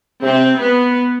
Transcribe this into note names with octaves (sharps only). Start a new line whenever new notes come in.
C3 C4
B3